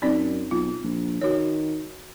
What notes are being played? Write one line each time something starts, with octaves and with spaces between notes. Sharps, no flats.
F#2 C4 D#4 D5
B1 F4
A#1
D#3 F#4 C#5